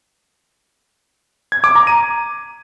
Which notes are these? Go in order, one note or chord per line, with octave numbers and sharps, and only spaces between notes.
G#6
D6
A#5
D#7